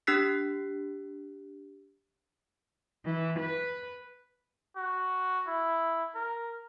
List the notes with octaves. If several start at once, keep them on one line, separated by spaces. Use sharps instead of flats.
D4 G4 E6 F#6 B6 C7
E3
B4
F#4
E4
A#4